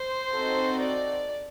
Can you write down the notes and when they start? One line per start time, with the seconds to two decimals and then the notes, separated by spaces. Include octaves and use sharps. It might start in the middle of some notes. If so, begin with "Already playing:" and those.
Already playing: C5
0.32 C4 D#4 F#4 A4
0.80 D5